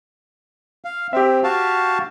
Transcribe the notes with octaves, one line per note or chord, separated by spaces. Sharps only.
F5
C4 G4 E5
F#4 F5 A5